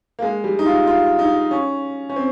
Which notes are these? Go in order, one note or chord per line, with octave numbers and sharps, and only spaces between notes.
A#3
G#3
G3
D#4
F4
F4
D#4
C#4
C#4
C4